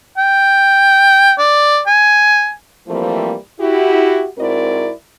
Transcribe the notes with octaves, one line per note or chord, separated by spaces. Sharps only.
G5
D5
G#5
E3 F3 G3 A3 A#3 C4
E4 F#4 G4
G#2 C4 E4 F#4 A#4 D5